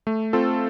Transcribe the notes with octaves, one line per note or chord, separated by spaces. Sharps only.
A3
C4 F4 A4